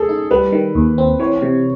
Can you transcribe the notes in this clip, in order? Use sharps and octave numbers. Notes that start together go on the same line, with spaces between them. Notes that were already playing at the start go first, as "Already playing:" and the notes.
Already playing: G#4 A4
D#4
G3 B4
D#3
D#2
C4
E3 C#5
C3